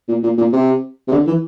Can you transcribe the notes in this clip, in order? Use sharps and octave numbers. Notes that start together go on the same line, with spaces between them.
A#2
A#2
A#2
C3
C3
D3
E3